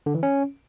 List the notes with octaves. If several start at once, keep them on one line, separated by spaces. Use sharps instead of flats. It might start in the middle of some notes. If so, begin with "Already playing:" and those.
D3
E3
C#4